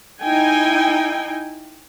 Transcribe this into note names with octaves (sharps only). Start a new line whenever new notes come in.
D#4 E4 G5 G#5